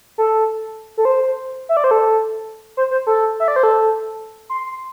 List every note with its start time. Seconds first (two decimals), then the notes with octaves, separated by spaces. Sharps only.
0.18 A4
0.97 A4
1.05 C5
1.69 E5
1.77 D5
1.84 C5
1.91 A4
2.77 C5
2.91 C5
3.07 A4
3.40 E5
3.48 D5
3.56 C5
3.63 A4
4.50 C6